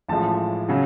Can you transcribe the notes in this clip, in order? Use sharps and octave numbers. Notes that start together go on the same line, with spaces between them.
A1 A2 F3 G#3 A5
C#3 F#3